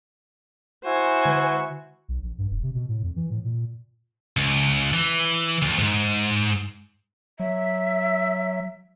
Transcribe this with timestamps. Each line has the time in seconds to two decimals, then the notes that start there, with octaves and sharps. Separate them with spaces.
0.85 E4 F#4 C5 G#5
1.25 D3
2.08 B1
2.22 A#1
2.38 G2
2.50 E1
2.63 C3
2.75 B2
2.89 A2
3.03 F2
3.16 E3
3.30 A2
3.44 A#2
4.37 C#2
4.93 E3
5.62 D2
5.79 G#2
7.40 F#3 E5